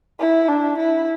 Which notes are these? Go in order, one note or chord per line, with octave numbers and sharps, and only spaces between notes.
E4
D4
E4